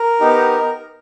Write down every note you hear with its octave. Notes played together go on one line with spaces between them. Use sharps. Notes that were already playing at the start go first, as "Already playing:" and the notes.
Already playing: A#4
B3 D#4 G4